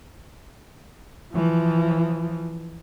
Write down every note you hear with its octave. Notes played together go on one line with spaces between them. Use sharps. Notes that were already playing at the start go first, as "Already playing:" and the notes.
E3 F3